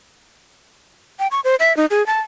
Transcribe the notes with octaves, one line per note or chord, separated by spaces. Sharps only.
G5
C#6
C5
E5
D#4
G#4
A5